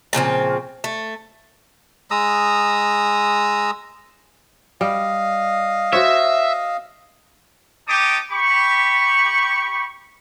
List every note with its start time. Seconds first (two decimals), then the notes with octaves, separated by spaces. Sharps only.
0.13 A#2 C#3 F3 C4
0.84 A3
2.11 G#3 A#5 D#6 E6
4.81 G3 D#5 F5
5.93 F#4 C5 C#5 E5
7.88 D#4 G4 C#5 A5 D6 D#6
8.32 G4 B5 C#6